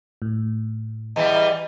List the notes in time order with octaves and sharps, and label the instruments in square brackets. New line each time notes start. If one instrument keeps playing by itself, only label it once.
[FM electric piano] A2
[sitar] E2 E3 G3 [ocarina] D#5